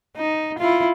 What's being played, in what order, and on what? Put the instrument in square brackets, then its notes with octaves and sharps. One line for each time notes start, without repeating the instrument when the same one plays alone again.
[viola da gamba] D#4
E4 F4